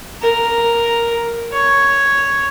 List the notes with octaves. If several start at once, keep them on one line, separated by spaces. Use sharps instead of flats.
A#4
C#5